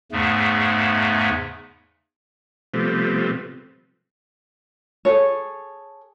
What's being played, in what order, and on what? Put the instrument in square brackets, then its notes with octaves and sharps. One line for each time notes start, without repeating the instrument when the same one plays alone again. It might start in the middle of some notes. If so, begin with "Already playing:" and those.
[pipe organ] E2 G#2 C#3 A3
[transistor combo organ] C3 F3 G3 A3 B3 C4
[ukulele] G#4 A4 C#5